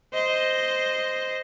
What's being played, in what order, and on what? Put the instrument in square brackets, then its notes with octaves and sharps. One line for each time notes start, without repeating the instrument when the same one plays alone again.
[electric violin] C5 D#5